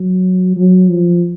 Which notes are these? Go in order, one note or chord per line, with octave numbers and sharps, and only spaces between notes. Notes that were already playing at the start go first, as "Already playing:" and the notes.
Already playing: F#3
F#3
F3